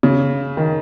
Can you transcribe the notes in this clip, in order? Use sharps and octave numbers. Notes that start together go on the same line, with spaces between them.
C#3
D#3